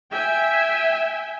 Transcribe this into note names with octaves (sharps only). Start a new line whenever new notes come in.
E5 G5 G#5